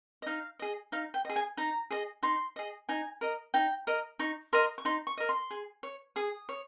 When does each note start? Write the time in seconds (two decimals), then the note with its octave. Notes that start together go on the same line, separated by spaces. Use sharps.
0.22 D#5
0.26 D#4 F5
0.59 G#4 D#5
0.92 D#4 F5
1.14 G5
1.25 G#4 D#5
1.36 G#5
1.57 D#4 A#5
1.91 G#4 D#5
2.23 D#4 C6
2.56 G#4 D#5
2.89 D#4 G#5
3.21 A#4 D#5
3.54 D#4 G5
3.87 A#4 D#5
4.19 D#4 C#6
4.53 A#4 D#5 C6
4.78 C#6
4.85 D#4 C6
5.07 C#6
5.17 A#4 D#5
5.29 C6
5.51 G#4
5.83 C#5
6.16 G#4 D#6
6.49 C#5